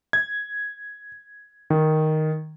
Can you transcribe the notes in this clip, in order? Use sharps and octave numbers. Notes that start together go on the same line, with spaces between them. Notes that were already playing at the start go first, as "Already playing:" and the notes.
G#6
D#3